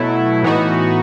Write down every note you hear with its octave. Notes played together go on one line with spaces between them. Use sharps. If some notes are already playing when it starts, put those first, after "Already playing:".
Already playing: B2 F#3 A3 E4
A2 E3 B3 D#4 F#4